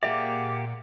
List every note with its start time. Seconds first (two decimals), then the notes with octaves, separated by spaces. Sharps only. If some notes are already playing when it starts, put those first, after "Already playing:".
0.03 A#2 A#3 G4 G#4 D5 E5 F#5 D6